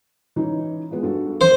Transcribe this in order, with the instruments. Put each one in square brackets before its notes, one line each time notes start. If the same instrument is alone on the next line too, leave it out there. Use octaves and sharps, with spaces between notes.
[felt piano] E3 C#4 D#4
F3 G#3 B3
G2 F#4 A4
[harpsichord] C5